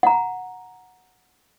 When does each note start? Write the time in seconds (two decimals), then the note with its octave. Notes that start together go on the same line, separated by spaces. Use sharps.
0.03 F#5 A#5